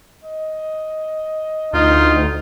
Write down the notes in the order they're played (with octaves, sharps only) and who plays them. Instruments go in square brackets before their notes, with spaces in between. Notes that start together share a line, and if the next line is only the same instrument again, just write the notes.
[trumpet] D#5
[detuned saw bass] D2 [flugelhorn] D#4 [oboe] F4